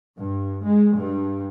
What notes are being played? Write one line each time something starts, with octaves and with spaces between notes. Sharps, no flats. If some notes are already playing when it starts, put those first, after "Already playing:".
G2
G#3
G2